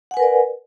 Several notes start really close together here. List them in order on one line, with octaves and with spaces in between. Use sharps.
F#5 G#5 B4 A#4 D5